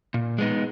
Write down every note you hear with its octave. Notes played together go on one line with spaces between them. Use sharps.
A#2
G#3 B3 D#4